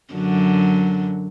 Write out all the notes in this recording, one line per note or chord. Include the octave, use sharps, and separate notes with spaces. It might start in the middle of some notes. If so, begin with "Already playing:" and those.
F#2 D3 F#3